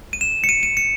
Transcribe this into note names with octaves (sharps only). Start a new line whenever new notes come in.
D#7
E7
C#7
D#7
D#7
C#7